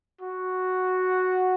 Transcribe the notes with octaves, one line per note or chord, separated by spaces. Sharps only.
F#4